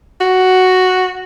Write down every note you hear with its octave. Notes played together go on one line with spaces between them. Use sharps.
F#4